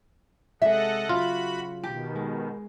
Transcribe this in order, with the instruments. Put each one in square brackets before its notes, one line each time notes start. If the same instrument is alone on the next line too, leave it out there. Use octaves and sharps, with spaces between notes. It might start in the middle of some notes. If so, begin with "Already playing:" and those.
[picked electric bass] C3 G#3 [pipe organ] A4 D#5 F#5 [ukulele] E5
[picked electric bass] C#3 F#3 [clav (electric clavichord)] F4 [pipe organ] F#4 B5
[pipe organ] B2 D#3 [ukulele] G4
[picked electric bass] G#3